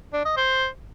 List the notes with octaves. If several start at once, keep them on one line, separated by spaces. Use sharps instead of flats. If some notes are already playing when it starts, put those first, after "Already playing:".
D4
D#5
C5